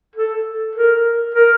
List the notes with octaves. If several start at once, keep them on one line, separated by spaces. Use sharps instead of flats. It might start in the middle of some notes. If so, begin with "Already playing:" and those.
A4
A#4
A#4